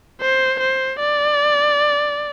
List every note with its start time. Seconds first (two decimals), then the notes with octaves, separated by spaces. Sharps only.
0.21 C5
0.60 C5
1.00 D5